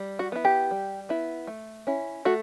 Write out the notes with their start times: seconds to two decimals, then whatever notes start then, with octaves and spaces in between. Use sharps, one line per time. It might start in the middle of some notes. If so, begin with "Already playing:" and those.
Already playing: G3
0.19 F#4
0.32 B3 E4
0.45 G4
0.71 G3
1.09 B3 E4
1.47 A3
1.87 C#4 E4
2.25 A3 F#4